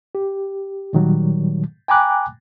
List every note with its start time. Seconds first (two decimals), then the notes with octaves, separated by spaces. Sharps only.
0.15 G4
0.93 A#2 D#3 F#3 G3
1.88 G5 G#5 A#5 B5 D6 F#6